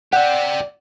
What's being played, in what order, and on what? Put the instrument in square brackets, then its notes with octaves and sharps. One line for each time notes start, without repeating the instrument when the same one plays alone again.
[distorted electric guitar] G4 E5 [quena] D5 [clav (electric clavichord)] F#5